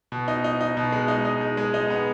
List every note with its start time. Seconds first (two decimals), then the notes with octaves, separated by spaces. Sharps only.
0.12 B2
0.28 D#4
0.44 D#4
0.61 D#4
0.77 B2
0.92 G#3
1.08 D#4
1.25 D#4
1.41 G#3
1.57 G#3
1.74 D#4
1.90 B3